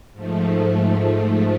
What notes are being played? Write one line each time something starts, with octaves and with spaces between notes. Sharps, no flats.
G#2 F3 A3